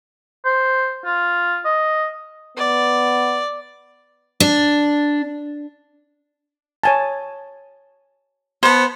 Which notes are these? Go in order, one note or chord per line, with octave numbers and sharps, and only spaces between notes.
C5
F4
D#5
B3 D5
D4
C#5 G#5 A5
B3 C5 A5